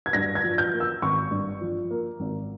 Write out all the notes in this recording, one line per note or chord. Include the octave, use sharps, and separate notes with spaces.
G#6
G2 A#6
G#6
F3
G6
A#3
E6
G#1 C#6
G2
F3
A#3
G#1